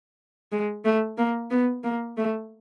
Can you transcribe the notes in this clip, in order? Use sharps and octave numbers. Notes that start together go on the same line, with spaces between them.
G#3
A3
A#3
B3
A#3
A3